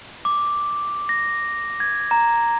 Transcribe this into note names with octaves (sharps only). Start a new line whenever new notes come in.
D6
A#6
G#6
A#5